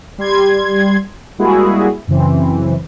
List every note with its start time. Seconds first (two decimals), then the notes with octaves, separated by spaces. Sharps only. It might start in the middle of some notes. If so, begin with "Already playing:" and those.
0.18 G3 C6 G#6
1.38 G3 G#3 A#3 E4 F#4 G#4
2.08 F#2 C#3 E3 C4